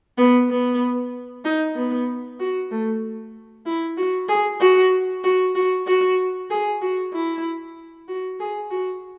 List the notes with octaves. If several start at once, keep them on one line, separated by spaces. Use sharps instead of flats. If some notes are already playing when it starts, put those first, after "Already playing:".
B3
B3
D#4
B3
F#4
A3
E4
F#4
G#4
F#4
F#4
F#4
F#4
G#4
F#4
E4
F#4
G#4
F#4